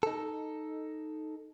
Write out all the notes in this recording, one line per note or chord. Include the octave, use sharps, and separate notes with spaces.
D#4 A4